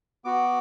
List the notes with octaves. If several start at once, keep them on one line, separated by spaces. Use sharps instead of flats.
B3 F#4 D6